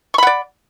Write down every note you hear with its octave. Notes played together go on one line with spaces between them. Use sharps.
D5 F#5 B5 C#6